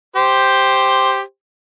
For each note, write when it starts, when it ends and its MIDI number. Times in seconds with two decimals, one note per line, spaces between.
0.16 1.21 67
0.16 1.21 72